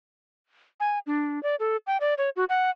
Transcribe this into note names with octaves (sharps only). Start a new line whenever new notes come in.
G#5
D4
D5
A4
G5
D5
C#5
F#4
F#5